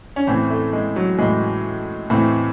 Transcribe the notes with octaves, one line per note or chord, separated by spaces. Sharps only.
C#4
A2 E3 C4
A3
G#3
F#3
A2 E3 G#3
A2 E3 C4